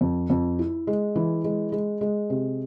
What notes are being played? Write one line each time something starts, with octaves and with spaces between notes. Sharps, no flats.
F2
F2
E4
G#3
E3
G#3
G#3
G#3
C3